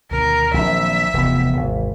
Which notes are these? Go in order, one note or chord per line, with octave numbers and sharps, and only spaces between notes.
D2 B2 D#3 A#4
A#1 D#3 F#3 C4 E5
F1 D#2 C3 E3 B3
G#1